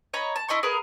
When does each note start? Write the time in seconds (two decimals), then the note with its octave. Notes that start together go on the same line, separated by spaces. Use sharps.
0.14 C#5 D#5 A#5 B5
0.36 A5
0.49 E4 D#5 C6 C#6
0.63 G#4 A#4 B4